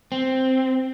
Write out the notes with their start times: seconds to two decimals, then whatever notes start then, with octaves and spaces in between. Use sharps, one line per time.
0.12 C4